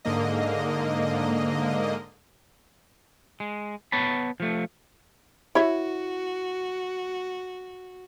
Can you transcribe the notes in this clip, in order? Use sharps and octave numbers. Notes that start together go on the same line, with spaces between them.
G#2 D3 A#3 D#5
G#3
B3 C#5 A5 B5
F3 A3
E4 F#4 C#5 E5